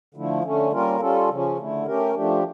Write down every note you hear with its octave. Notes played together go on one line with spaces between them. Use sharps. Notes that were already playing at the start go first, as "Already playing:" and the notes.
D3 F3 A3 E4
D3 A3 C#4
G3 A#3 C#4 F4 A#4
G3 C#4 F4 A4
C#3 F3 C#4
D3 A3 E4
A3 C#4 G4 A#4
F3 A3 D4 G4